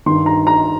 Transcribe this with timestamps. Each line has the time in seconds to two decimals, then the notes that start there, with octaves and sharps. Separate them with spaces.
0.06 G2 D#3 C6
0.26 A#5
0.47 A#5